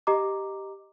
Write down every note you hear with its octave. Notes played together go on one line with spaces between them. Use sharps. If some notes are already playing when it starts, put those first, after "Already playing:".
G4 D#5 A#5 D6